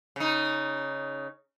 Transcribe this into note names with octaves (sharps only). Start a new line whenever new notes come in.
C#3 D#4